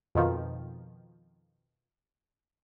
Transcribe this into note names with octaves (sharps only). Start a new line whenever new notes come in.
F2 B2 D#3 F3